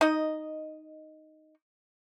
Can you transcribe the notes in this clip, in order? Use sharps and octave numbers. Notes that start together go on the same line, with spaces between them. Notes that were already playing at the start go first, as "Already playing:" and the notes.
D#4 D#5